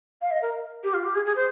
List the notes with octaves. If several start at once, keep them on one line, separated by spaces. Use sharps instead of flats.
F5
D#5
A#4
G4
F4
G4
G#4
G#4
C5